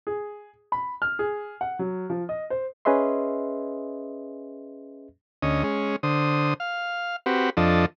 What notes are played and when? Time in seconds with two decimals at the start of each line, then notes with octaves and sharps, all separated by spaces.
0.07 G#4
0.72 B5
1.02 F6
1.19 G#4
1.61 F#5
1.79 F#3
2.10 F3
2.29 D#5
2.50 C5
2.85 C#4 G#4 B4 D#5 E5 C6
5.43 D2 C#4 D#5
5.64 G#3 C#4
6.03 D3 C5 D#6
6.60 F5
7.26 C4 F#4 G4 B4
7.57 F2 F3 D4 A4 D#5